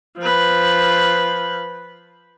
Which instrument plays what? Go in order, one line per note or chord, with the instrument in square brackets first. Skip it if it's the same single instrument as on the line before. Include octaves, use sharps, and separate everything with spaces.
[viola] F3 B4